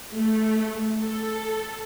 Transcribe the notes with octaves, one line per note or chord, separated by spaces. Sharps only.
A3
A4